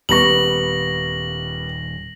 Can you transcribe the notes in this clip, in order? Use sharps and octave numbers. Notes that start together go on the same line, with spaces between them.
D#1 G3 B3 C#6 A#6 F#7